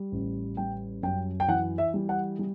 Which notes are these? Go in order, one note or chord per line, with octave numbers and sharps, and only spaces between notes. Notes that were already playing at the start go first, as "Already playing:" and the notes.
Already playing: G3
A1
G3 G5
F#2 G5
G5
E3 F#5
E5
G3
F#5
G3